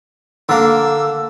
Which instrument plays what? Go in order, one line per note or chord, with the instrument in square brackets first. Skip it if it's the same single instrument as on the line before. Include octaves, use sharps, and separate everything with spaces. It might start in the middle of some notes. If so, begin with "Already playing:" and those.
[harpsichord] D3 A#3 [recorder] E6